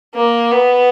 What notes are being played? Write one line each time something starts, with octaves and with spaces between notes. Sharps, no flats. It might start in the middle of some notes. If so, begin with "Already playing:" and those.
A#3
B3